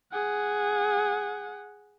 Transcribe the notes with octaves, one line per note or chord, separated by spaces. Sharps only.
G#4 F#5